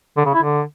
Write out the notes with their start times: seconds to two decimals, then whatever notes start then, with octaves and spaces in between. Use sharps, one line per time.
0.17 D3
0.26 C#3
0.34 E4
0.43 D3